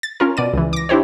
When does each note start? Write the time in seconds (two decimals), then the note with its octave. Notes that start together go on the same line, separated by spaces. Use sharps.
0.03 A6
0.20 C#4 F4 A#4
0.37 B2 D5 D#7
0.53 C#2 E3
0.73 D6 A#6
0.89 D4 E4 G4 C5 C#5